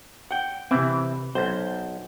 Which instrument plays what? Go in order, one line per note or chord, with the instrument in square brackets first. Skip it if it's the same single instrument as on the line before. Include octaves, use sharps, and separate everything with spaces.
[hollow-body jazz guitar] F#5 G5
[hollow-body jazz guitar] C3 C4 [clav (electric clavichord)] E3
[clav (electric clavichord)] B1 [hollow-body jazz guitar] C5